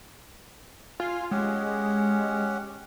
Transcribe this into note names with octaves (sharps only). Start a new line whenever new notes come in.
F4 G#5
G#3 C#4 G4 F#5